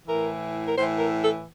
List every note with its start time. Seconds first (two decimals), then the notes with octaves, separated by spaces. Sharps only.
0.07 A2 E3 A#4
0.67 A#4
0.76 A2 E3 C5
0.99 A#4
1.22 A4